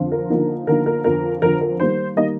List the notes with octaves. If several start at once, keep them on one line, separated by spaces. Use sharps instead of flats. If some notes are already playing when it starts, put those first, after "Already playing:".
Already playing: F2 D3 F3 C4 F4
A#4
D3 F3 A#3 D#4
D3 F3 A#3 D#4 A#4
A#4
F2 D3 F3 A#4
F2 D3 F3 A#4
A#4
D#3 G3 A#3 C5
D#3 G3 A#3 D#5